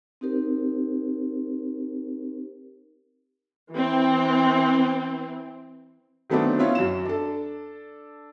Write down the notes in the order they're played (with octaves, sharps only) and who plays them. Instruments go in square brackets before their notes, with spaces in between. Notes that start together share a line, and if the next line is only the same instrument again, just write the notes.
[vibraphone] C4 D#4 G4 A#4 C5
[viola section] E3 C4
[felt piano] D#3 F#3 A3 B3 C4 D4
B3 C#4 E4 F4
F#2 E7
D4 A4